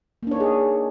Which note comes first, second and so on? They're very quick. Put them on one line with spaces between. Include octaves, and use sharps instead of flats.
A#3 D4 C#5 D#4 G#4